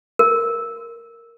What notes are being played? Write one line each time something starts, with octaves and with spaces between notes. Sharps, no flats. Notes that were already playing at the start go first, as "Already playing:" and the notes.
A#4